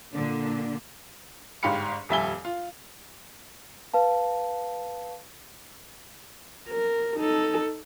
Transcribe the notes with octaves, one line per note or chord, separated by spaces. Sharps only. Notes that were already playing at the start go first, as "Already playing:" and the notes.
A#2 D3 D4
G1 G#2 G4 F5 B5 C#7
D#1 F2 G3 E5 G#5 G7
F4
B4 F5 A5
A#4
D#4 A4